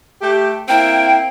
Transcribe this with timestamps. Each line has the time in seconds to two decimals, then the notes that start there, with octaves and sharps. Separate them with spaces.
0.20 A3 G4
0.68 A#3 C4 E4 G5